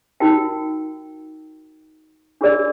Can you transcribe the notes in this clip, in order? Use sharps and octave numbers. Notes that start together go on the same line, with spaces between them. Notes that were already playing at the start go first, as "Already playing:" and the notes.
D#4 F#4 A#4 G5
D4 F#4 G#4 A#4 D5